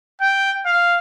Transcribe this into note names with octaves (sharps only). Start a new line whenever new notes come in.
G5
F5